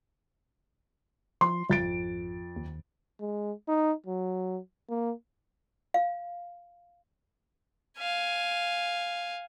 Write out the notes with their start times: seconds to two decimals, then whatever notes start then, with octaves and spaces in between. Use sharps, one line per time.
1.41 F3 C6
1.70 G#1 F2 A6 D7
2.56 D#2
3.20 G#3
3.68 D#4
4.06 F#3
4.89 A#3
5.94 F5
7.98 F5 G#5